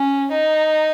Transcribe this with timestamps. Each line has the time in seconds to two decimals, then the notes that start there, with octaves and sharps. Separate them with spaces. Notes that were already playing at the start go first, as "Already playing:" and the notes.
Already playing: C#4
0.32 D#4